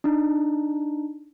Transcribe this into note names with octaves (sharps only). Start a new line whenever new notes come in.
D4 D#4